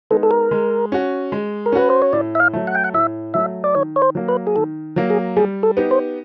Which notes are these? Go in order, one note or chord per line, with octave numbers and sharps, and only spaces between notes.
G#3 B3 D#4 A4
A4
A#4
G#3
C#4 F#4
G#3
A#4
C#4 F#4 B4
C5
C#5
A2 D5
E5
F5
F#3 A3
F#5
G5
F#5
A2 E5
F#3 A3 E5
D5
D#3 C#5
C#5
C5
F#3 A#3
B4
G#4
D#3 A4
F#3 A#3
G#4
G3 G#4
A4
B3 D#4 G4
C5